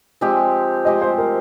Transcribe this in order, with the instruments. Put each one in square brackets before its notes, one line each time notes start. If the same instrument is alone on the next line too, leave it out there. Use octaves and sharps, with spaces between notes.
[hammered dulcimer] F3 G#3 C4 G4
[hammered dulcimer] F3 G#3 C4 G4 [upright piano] D#5
[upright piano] C5
A#4